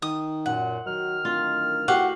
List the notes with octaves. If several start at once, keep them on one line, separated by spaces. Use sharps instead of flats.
D#3 D#6
F#2 A#2 F#5
D#3 F#3 F6
D1 F4
A2 F#4 G4 F5 F#5